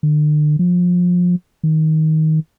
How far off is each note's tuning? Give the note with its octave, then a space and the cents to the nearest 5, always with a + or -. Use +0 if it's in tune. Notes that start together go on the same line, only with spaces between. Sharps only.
D3 +40
F3 +25
D#3 +15